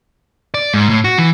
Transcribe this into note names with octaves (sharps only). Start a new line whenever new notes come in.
D5
G#2
A2
F#4
E3